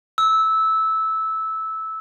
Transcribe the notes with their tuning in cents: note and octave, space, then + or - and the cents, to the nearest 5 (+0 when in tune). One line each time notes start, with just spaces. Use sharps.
E6 -15